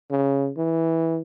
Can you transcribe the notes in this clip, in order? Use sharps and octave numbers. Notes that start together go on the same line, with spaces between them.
C#3
E3